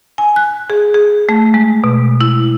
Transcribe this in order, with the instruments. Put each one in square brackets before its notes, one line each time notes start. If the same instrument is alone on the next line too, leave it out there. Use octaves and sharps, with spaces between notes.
[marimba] G#5
F#6
G#4
G#4
A3
G#3
B2
E4